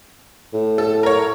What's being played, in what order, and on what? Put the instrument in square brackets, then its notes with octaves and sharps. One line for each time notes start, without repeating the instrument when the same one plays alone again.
[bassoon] A2
[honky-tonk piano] A4
A#4 C#5